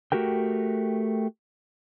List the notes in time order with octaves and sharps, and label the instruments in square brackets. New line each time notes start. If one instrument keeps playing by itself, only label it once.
[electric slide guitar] A3 F#4 G4 A#4 G5